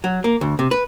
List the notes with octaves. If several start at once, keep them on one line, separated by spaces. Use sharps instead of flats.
F#3
A#3
D2
C3
B4